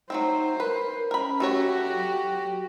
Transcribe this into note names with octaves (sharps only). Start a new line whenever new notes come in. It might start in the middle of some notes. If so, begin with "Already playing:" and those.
F#3 A3 C4 D#4 C5
A#4 B4
C#4 A#4 B5
A3 F#4 G4 A4 C#5
F#3